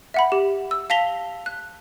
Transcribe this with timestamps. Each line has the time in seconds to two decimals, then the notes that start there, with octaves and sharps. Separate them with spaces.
0.14 E5 F#5 B5
0.32 G4
0.71 E6
0.90 F5 A5 A#6 B6 F7 G7
1.46 F#6